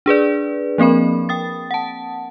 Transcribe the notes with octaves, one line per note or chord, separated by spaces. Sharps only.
D4 G#4 B4 D5
F3 A#3 C4 A#4 B5
G5 D#6 A6
F#5 A5